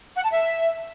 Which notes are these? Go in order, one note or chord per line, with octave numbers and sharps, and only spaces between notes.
F#5
A5
E5